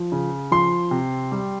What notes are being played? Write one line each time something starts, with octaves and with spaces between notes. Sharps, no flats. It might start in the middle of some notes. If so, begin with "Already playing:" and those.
Already playing: F3
C#3
F3 C6
C3
G3